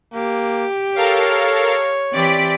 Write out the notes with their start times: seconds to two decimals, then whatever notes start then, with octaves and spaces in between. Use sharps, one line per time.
0.14 A#3 G4
0.96 A4 A#4 C#5 F5
2.13 E3 C4 G4 D5 B6 D7